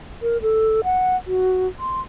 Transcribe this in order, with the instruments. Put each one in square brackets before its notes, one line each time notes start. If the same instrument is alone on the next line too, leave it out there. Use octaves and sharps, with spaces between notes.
[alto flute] A#4
A4
F#5
F#4
C6